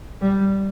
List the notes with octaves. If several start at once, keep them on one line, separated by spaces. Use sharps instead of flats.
G3